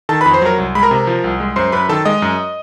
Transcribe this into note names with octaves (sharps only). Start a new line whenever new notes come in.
D#3 A4 A5
B4 B5
F2
C5 C6
F#3 A#4 A#5
C2
G#3 B5
A#4 A#5
C3
F3
C2
G#3
F#2 C5 C6
F#2 B4 B5
D#3 A4 A5
G#3 D#5 D#6
F#2